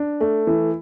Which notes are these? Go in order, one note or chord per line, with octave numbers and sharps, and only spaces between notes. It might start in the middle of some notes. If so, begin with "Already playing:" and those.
Already playing: D4
A3
E3